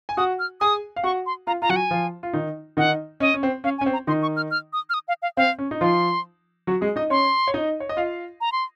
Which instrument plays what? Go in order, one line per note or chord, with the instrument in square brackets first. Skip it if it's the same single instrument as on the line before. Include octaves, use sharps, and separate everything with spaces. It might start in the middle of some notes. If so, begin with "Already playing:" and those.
[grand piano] G#5
[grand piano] F#4 F#5 [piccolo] D#6
[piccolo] F6
[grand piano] G#4 G#5 [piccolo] D#6
[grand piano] F5
[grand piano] F#4 F#5 [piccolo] C#6
[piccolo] C6
[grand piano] F4 F5 [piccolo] A#5
[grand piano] F4 [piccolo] A#5
[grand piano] F#3 F#4 [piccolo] F#5
[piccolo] G#5
[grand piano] F3 F4
F4
D#3 D#4
[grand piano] D#3 D#4 [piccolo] F#5
[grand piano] C#4 [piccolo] D#5
[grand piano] C#4
C4
[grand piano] C#4 [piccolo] F5
[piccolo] G#5
[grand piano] C#4
C4
[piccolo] A#5
[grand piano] D#3 D#4 [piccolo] C6
[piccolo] C#6
F6
F6
D#6
F6
D#6
F5
F5
[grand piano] C4 [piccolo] F5
[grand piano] C#4
D#4
[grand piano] F3 F4 [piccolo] C6
[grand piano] F#3 F#4
G#3 G#4
D#4 D#5
[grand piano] C#4 C#5 [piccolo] C6
[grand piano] C#5
D#4 D#5
C#5
D#5
F4 F5
[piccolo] A#5
C6